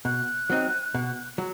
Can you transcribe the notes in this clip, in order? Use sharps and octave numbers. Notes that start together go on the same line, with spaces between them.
B2 F#6
F#3 C4 D#4
B2
F#3